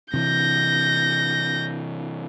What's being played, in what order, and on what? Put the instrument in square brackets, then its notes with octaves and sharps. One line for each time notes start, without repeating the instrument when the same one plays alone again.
[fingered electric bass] C3 E3 [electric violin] G6 A#6